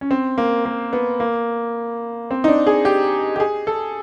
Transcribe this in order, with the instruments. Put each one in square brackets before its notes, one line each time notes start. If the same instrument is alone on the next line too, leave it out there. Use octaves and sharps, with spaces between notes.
[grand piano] C#4
C4
A#3
A#3
B3
A#3
C4
D#4
D4
G#4
G4
G4
G#4
A4